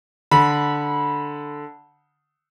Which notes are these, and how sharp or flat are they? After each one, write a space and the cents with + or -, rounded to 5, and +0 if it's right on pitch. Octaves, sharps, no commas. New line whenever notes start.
D3 +0 B5 -20